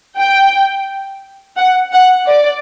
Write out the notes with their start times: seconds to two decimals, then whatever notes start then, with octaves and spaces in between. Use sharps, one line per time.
0.18 G5
1.57 F#5
1.93 F#5
2.27 D5